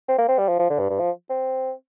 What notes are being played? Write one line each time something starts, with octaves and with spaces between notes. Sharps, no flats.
C4
A#3
C4
G3
F3
F3
D3
G2
G2
F3
C4